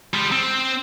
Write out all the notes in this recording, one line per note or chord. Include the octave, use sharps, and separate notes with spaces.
G3 G#3
C4